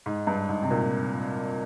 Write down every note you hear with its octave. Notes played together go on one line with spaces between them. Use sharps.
G#2
G2
G#2
C3
A#2